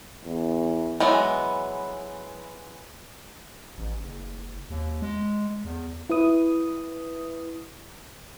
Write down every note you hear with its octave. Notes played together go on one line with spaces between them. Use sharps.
E2
E3 F#3 G#3 B3
A1
F#1
D#2
G#3
E2
E4 B4 D#6